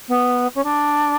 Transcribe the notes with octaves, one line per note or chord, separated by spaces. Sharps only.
B3
C#4
D4